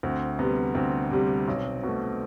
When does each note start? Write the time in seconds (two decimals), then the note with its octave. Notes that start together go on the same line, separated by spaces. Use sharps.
0.03 D2 C4
0.39 C3 G3 B3
0.75 D2 C4
1.11 C3 G3
1.48 B1
1.83 B2 A3